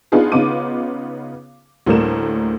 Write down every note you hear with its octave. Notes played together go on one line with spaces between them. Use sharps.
B3 D4 D#4 F4 G#4 B4
C#3 B3 D#4 F4 D6 D#7
D2 A2 G3 A#3 A#4 E7